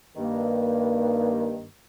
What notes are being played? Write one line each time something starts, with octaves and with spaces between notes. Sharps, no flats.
G2 D#3 A#3